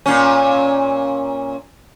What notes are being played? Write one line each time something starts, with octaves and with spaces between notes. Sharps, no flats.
A#2 C#4